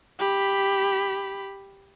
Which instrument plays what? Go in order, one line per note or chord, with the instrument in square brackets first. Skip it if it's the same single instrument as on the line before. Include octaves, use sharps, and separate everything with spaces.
[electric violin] G4 B5